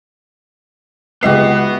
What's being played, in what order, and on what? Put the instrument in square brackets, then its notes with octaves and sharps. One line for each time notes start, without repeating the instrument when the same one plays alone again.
[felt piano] C#2 D#5 C7 [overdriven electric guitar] B3 [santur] F#4 G4 E5